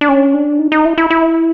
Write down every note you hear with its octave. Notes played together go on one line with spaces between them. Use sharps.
D4
C#4
D4
D#4
D#4
E4
E4
E4